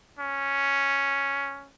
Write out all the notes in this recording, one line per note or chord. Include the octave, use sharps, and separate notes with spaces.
C#4